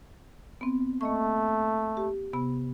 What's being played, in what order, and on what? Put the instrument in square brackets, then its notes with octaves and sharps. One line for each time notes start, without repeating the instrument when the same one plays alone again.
[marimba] B3 C4
[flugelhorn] A3 [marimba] A#3 D#5 C#6
[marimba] G4
C3 B3 B5